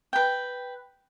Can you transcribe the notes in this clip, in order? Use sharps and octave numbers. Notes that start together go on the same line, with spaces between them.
B4 G5